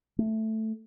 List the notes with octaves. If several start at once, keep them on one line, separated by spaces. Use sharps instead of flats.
A3